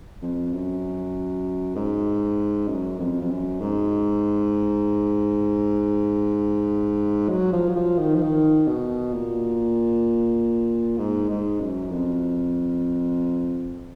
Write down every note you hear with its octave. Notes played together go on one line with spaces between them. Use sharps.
F2
F#2
G#2
F#2
F2
F2
F#2
G#2
F#3
F3
F#3
F3
D#3
F3
D#3
B2
A#2
G#2
G#2
F#2
F2